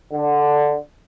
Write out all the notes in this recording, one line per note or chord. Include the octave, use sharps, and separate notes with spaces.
D3